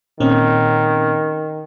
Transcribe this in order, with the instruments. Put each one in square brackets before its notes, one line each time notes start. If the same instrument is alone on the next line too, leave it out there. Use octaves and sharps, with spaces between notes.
[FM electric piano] A#2 C4 C#4 [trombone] D#3